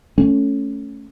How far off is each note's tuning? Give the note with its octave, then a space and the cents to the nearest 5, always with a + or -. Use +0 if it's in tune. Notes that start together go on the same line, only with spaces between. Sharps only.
A3 +0 C#4 +0